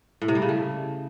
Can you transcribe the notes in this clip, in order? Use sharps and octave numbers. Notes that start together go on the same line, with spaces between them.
A2
C3
G3
C#3
A3